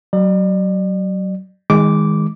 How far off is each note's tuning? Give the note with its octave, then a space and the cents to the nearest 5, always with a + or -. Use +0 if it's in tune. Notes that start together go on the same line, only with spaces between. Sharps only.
F#3 +30 D5 +40
D#3 +25 G#3 -15 D6 -10